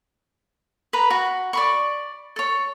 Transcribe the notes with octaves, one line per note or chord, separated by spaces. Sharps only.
B4 A#5 B5
F#4
D5 B5 C#6
A4 C#5